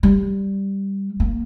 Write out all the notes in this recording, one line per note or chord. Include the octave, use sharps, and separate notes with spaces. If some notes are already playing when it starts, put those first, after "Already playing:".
G3
A#3